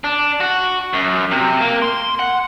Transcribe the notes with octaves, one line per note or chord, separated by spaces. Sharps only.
D4
F#4
F#2
C3
A#3
C6
F#5